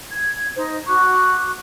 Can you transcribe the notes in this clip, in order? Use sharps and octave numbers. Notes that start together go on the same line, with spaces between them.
G#6
D#4 C5
F#4 C#6 D6 F#6